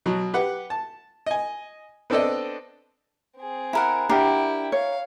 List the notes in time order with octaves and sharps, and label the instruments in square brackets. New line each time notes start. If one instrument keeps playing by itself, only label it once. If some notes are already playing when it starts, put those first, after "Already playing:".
[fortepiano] B2 F#3
G4 B4 F#5
A5
D#5 G#5
B3 C4 D4 A4 D5 D#5
[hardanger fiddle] C4 G#4
[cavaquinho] E4 A#4 F#5
[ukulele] D4 G4 F#5 [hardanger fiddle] E4 G5 [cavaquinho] A#4
[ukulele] C#5 [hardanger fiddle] F5